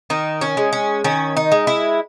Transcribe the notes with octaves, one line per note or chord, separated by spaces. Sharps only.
D#3 D#4
C#4
G#3
C#4
D#3 C#4
D#4
G#3
E4